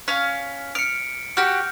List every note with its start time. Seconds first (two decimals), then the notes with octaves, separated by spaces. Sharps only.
0.08 C#4 F5 B6
0.75 F6 C#7 D7
1.37 F#4 G4 F6 G6 A#6